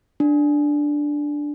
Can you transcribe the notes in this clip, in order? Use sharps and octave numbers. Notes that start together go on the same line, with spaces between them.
D4